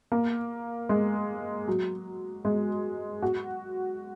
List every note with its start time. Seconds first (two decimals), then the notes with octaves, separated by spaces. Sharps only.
0.12 A#3
0.89 G#3
1.68 F#3
2.45 G#3
3.22 F#4